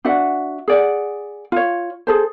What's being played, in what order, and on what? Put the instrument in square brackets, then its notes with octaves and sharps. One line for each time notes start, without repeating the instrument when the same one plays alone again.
[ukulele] D4 F#4 E5 F#5
G#4 D5 F#5
F4 C#5
G#4 A4 C5